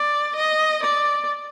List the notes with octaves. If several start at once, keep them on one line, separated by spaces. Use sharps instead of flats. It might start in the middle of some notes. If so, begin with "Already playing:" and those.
Already playing: D5
D#5
D5